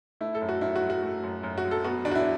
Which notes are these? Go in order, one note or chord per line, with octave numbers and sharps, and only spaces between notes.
A3 E4
A4
F#2
F#4
F#2 E4
F#4
F#3
F#4
A3
F#2
F#2
F#4
F#3
A4
B3 F#4
E2 D4
F#4
E4